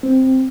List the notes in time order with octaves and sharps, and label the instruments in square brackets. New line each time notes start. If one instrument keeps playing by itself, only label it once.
[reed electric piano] C4